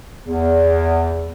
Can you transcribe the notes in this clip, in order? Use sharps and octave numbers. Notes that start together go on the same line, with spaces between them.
E2